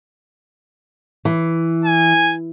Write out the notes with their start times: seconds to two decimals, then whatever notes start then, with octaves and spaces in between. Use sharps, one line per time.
1.25 E3
1.85 G#5